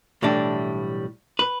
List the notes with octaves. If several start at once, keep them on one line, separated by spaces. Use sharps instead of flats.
B1 A2 E3 G3 D4
B4